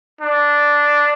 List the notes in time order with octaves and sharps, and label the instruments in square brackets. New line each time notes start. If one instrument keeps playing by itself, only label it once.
[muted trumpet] D4